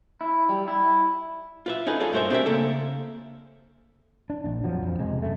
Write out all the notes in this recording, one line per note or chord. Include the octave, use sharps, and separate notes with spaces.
E4
G3
E4
F4 B4 E5
C#4 D#4 G#4 A4 B4
C#4 F4 G#4 A4 D5
G2 A3 A#4 C5 C#5 E5
C4 D4 G4 G#4 A#4 E5
C#3 A#3 A4
D4
A#1 D4
F2 F3 F#3
F2
E1 C3 G#3
F#2 A3